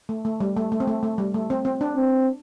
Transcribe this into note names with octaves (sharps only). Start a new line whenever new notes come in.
A3
A3
G3
A3
A3
C4
A3
A3
G3
A3
C4
C4
D4
C4